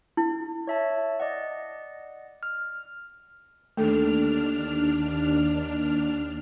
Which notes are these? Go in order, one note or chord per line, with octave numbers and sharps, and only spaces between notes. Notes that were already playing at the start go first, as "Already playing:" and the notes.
E4
C#5 E5 A5
D5 D#5 F#5
F6
D#2 A3 D4 A4 F6